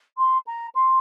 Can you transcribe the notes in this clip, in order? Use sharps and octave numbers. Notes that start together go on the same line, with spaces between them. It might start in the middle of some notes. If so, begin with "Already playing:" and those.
C6
A#5
C6